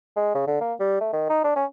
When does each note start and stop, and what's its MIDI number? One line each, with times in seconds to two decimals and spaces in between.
0.17 0.33 56
0.35 0.43 49
0.48 0.57 50
0.61 0.74 58
0.80 0.99 55
1.01 1.13 57
1.13 1.27 51
1.30 1.44 63
1.44 1.52 62
1.56 1.65 61